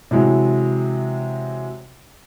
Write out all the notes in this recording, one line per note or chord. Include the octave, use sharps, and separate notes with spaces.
C3 E3 F#3 G#3